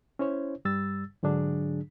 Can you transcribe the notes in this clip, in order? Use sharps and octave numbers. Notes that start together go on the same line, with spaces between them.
C#4 E4 C5 C#5
G2 G3 E6 A6
G#2 D3 F#3 D4 G#4